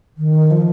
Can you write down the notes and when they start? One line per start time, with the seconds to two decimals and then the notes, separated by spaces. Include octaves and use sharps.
0.17 D#3
0.51 F3